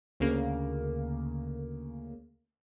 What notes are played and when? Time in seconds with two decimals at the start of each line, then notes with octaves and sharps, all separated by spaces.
0.20 D2 C#3 A#3